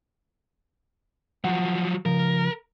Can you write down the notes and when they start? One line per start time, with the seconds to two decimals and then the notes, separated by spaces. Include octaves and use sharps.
1.44 F3 F#3 F#5
2.06 C#3 F3 A#4